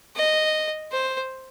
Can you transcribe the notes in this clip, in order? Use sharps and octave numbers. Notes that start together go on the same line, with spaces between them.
D#5
C5